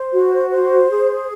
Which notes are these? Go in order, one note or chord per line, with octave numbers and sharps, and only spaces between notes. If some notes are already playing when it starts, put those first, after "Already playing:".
Already playing: C5
F#4
C5
G#4